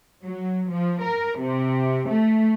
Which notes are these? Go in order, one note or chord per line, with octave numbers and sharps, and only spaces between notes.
F#3
F3
A#4
C3
A3